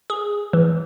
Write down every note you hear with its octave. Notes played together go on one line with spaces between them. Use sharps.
G#4
E3